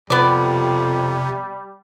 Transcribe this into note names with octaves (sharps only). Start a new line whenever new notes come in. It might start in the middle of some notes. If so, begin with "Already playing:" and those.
F2 C3 G3 B3 D5